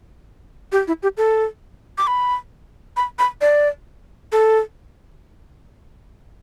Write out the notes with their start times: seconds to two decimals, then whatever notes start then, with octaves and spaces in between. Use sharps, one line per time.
0.72 G4
0.88 E4
1.03 G4
1.17 A4
1.98 D6
2.07 B5
2.97 B5
3.19 B5
3.41 D5
4.32 A4